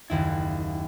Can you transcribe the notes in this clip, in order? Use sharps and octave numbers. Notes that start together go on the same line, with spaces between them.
F#1 D#2 E4 G#6